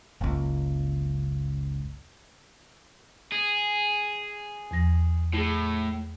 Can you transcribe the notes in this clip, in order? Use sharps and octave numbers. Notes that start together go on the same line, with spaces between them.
F#1 C#2
G#4
E2 F3 A#6
A2 E4 G#4